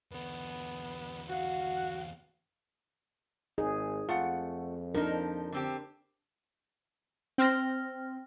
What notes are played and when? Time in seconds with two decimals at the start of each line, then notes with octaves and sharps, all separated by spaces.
0.12 E2 D3 B3
1.29 F#4 F5 F#5
3.58 G#1 D#4 G#4
4.09 F2 A3 F4 F#5
4.95 F3 D4 D#4 A#4
5.52 D3 C4 G4
7.38 C4 G5 F6 A#6